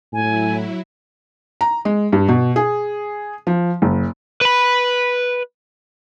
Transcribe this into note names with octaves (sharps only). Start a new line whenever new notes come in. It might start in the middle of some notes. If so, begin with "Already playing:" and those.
A2 F#3 E4 G#5
A#5
G#3
G2
B2
G#4
F3
F#1
B4 B5